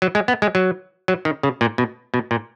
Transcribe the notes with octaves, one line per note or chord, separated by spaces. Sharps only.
F#3
G#3
B3
G#3
F#3
F#3
D#3
C#3
A#2
B2
B2
A#2